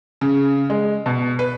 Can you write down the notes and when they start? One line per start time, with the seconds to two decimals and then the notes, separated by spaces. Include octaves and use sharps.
0.21 C#3
0.70 G#3
1.06 B2
1.39 B4